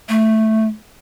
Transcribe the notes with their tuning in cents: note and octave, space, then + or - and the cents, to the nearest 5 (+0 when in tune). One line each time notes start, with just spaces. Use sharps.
A3 +0